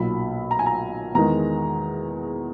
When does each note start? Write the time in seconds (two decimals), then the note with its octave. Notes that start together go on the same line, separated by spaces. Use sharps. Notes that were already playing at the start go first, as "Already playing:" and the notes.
Already playing: B1 A#2 F#3 B5
0.51 A#5
0.59 G#5
0.66 A#5
1.15 E2 D#3 G#3 A#5